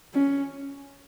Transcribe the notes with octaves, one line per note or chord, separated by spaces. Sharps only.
C#4